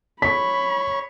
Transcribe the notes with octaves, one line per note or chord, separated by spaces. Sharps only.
C#5 B5 B6